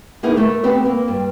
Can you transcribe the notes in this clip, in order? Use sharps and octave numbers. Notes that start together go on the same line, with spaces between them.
A#3 B3 D#4 E4 G#4 A#4
A3 A#4
B3 C4 G4 B4
A#3
G2